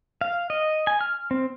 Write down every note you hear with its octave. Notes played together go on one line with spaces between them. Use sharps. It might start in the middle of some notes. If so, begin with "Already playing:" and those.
F5
D#5
G#5
F6
C4